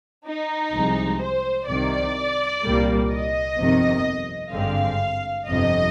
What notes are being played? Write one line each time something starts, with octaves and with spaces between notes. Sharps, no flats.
D#4
C2 C3 F3 G#3
C5
C2 C3 D#3 D5
C2 A#2 G3 A#3
D#5
G1 F2 C3 D#3
G#1 G2 D3 G#3 C4 F5
G1 F2 C3 D#5